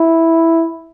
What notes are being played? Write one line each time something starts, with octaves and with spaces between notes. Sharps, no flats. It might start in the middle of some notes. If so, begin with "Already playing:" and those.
Already playing: E4